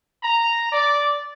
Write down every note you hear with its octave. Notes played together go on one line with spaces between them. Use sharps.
A#5
D5